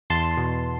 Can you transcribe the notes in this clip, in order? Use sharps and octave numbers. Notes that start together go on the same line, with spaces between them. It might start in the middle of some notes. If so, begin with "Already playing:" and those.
E2 A5 C6
B2